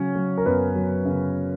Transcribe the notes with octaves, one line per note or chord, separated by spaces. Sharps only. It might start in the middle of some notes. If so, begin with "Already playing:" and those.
Already playing: C#3 F#3 C#4 C#5
F#3
A#4
F#2 B3 B4
F#3
C#3